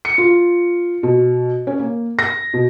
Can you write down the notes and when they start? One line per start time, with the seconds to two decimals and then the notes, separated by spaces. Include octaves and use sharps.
0.05 C#7
0.18 F4
1.03 B2
1.67 C#4
1.79 A#3
2.19 A#6
2.54 B2